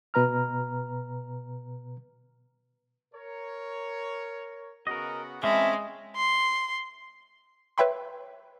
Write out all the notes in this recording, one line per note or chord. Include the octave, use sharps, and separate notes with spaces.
B2 B4 A#5 F6
A#4 C#5
C#3 B3 F#4 A#4 D#5
E3 G#3 C4 C#4 E5 F5 A5 B5
C6
B4 C#5 E5 G5 B5 C6